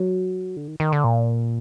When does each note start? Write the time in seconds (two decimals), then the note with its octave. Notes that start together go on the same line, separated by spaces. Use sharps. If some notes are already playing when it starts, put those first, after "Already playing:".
Already playing: F#3
0.57 D3
0.68 D#3
0.80 D#3
0.92 D3
1.04 A#2